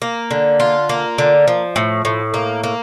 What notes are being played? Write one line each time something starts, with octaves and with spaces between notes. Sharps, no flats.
A#3
D3
F4
A#3
D3
F3
A2
A2
A#3
A#3